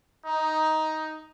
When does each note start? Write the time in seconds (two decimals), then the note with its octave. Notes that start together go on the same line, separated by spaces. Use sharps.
0.25 D#4